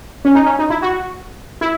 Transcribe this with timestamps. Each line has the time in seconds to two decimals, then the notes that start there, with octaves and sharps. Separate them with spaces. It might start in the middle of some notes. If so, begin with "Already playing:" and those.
0.25 C#4
0.35 D#4
0.46 C#4
0.59 D#4
0.70 E4
0.82 F#4
1.61 E4